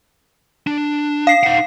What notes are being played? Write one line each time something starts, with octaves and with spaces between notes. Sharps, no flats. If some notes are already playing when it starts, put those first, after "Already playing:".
D4
F5 C7
D#4 F#5